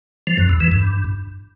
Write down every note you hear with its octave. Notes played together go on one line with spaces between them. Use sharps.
F3
F#2
E2
E3
G2